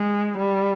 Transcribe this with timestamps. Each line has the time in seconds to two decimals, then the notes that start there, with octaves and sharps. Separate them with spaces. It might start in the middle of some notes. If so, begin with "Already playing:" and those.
Already playing: G#3
0.38 G3